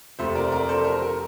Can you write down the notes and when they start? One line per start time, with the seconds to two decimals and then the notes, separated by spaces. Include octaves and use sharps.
0.19 F2 C3 F3 A3 C5 E5
0.35 A#4 D5
0.52 A#4 D5
0.69 A4 C5
0.85 A#4
1.02 A#4